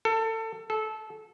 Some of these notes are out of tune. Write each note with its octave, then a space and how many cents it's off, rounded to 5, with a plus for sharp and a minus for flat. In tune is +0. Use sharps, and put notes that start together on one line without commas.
A4 +25
A4 -20